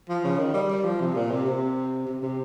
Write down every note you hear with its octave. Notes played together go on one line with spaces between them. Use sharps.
F3
C#3
D#3
G3
G3
F3
C3
A#2
C3
C3
C3
C3